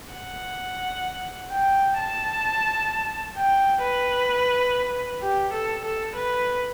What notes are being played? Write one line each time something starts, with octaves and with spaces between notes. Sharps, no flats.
F#5
G5
A5
G5
B4
G4
A4
A4
B4